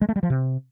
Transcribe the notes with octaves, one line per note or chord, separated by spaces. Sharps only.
G#3
A3
G3
F3
C3